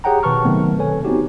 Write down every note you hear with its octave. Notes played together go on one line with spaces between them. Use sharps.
G4 G#4 C#5 F#5 G5 A#5
B2 D#3 B4 A5 C#6 F6
C3 D#3 F#3 A3 B3 C4
A4 B4 C#5 G#5
B3 C4 D#4 F#4 G4